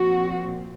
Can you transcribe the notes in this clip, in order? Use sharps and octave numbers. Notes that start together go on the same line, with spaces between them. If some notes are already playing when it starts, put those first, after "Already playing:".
Already playing: A#2 F3 C4 F#4